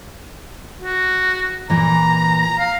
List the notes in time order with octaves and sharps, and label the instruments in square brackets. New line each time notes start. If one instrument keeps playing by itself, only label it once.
[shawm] F#4
[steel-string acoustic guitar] A#2 E3 [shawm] A#5
[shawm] F5